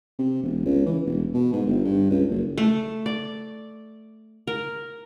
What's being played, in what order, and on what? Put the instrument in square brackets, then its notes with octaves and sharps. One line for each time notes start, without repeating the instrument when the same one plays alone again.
[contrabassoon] C3
E1
C#2
E3
E1
B2
G#2
G1
G2
C#2
F#1
[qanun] A3
D5
A#4